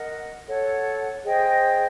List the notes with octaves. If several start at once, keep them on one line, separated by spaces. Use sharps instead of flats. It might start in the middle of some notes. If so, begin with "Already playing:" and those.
Already playing: A#4 D#5 F#5
A4 C#5 F#5
G#4 C5 D#5 G5